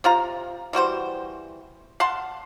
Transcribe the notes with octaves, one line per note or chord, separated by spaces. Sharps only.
C3 F4 A#5
E3 G3 F#4 C5
F5 F#5 A5 C6